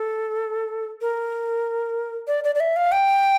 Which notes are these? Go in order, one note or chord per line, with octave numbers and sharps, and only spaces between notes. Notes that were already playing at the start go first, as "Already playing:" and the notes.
Already playing: A4
A#4
D5
D5
D5
E5
F5
G5